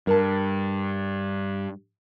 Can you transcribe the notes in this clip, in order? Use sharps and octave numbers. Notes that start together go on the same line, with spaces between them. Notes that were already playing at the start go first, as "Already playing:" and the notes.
G2 A#4 A5